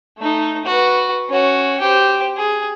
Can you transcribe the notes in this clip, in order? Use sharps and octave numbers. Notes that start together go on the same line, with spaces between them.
A3 D#4
F#4 B4
C#4 F#4
G4 C5
G#4